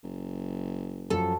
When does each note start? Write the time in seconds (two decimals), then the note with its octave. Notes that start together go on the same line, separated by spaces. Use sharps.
0.03 F#1
1.10 F#2 F3 A4